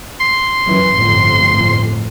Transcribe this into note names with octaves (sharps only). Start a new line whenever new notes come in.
C6
F#2 E3
G1 F2 A2